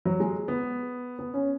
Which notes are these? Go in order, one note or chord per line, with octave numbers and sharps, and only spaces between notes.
F#3
G#3
B3
B3
C#4